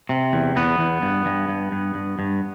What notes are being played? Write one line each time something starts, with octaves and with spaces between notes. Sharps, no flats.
C3
E2
E2 B3
E2
G2
G2
G2
G2
G2
G2